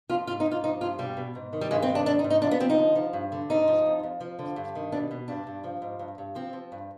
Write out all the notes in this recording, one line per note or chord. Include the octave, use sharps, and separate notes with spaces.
F2 F4
G#2 F4
D#4
G#2
F4
F3 D#4
G2 F4
B2 G3
B2
G#2
D#3
G3
G2 G#3
C4
D#3
D4
G#2 D4
D#4
G#2
D#4
F3 D4
B3
F3 C4
D#4
D3
F3
G2
D3
G#2 D#4
F3
F2
F2
F3
D3
G2
D#3
B2 D4
B2
G2 D4
G2
F3
G#2
G2
G2
F3 C4
F3
G2